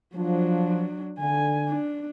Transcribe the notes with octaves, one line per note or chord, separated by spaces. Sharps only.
F3 F#3 D4
D3 G#5
D4